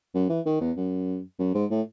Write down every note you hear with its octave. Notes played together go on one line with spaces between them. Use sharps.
F#2
E3
D#3
E2
F#2
F#2
G#2
A2